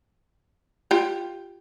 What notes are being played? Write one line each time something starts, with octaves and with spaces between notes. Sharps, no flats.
F4 G4